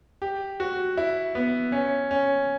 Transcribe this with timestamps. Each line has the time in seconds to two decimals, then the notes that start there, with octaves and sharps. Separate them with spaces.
0.22 G4
0.60 F#4
0.97 E4
1.35 B3
1.72 C#4
2.11 C#4